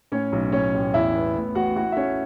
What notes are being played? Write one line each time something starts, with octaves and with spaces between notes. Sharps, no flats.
A2 C#4 C#5
B1
A2 C#4 C#5
A1
E2 E4 E5
B3
A2
A1 F#4 F#5
E4 F#4 F#5
E5
A3 C#4 C#5